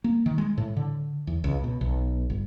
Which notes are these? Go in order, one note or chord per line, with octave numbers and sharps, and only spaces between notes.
A#3
D#3
G#3
A2
D3
E2
C#2
B2
B1
G1